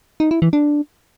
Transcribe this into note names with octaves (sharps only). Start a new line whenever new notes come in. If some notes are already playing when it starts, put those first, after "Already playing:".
D#4
E4
E3
D4